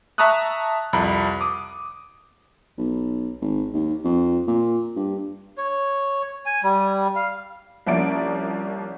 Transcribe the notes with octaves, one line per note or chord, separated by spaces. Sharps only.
E5 A5 A#5 C#6 D#6 F#6
C2 F2 A#5 B5
D6 D#6
B1
G#1
D#2
F2
A#2
G2
C#5
G#5
G3
F5
C2 F3 A#3 C#4 D5 D7